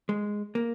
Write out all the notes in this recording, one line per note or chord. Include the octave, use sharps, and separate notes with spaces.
G#3
A#3